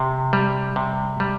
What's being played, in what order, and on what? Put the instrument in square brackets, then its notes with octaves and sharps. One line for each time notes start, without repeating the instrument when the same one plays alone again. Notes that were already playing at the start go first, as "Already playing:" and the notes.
Already playing: [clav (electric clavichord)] C3
G3
C3
G3